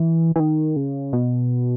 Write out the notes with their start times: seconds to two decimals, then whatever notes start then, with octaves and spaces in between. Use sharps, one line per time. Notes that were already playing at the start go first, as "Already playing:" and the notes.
Already playing: E3
0.36 E3
0.40 D#3
0.76 C#3
1.13 B2